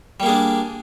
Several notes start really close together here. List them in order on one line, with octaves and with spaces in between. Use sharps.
G3 A#3 G#4 D4